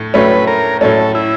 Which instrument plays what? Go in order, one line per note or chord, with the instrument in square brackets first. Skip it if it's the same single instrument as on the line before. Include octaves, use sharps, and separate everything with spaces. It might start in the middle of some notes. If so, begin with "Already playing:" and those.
Already playing: [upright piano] A2 A3
[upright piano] A2 F#3 A3 C#4 [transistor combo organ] B4
[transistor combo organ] A#4
[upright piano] A2 F#3 A3 C#4 [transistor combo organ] A4
[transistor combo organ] E4